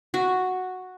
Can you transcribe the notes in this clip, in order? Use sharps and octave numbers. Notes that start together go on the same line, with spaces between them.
F#4